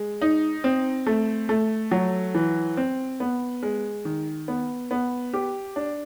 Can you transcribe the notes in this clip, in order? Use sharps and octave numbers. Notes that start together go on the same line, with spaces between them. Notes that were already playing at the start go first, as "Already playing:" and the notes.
Already playing: G#3
D#4
C4
A3
A3
F#3
E3
C4
B3
G#3
D#3
B3
B3
G4
D4